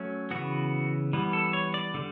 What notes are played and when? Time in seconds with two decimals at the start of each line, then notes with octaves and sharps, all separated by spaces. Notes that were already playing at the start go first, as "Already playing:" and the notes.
Already playing: F#3 A3 C#4
0.31 C#3 E3 B3 F#4
1.13 E3 G3 B3
1.33 A4
1.53 C#5
1.74 D5
1.94 D3 G3